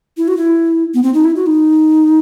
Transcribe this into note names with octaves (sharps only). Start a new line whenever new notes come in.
E4
F#4
E4
B3
C4
D#4
E4
F#4
D#4